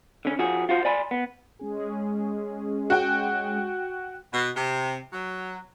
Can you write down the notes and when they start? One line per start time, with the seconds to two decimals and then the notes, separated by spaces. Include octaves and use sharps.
0.25 D3 C#4
0.39 F3 F#4 G#4
0.69 F4 F#4 C5
0.85 D5 G#5 B5 C6
1.11 B3
1.59 G#3 C#4 G#4
2.90 F#4 G5
4.32 B2
4.56 C3
5.13 F#3